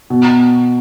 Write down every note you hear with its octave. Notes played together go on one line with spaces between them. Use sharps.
B2